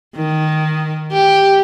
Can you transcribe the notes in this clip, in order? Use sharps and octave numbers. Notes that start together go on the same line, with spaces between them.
D#3
G4